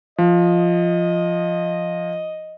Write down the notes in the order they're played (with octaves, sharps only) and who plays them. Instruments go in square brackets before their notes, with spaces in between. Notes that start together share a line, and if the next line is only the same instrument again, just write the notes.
[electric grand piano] F3 [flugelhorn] D#5